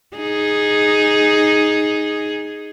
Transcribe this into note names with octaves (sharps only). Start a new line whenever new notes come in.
D#4 G#4